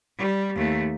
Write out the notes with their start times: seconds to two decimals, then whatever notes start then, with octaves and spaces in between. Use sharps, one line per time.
0.18 G3
0.56 D#2 A3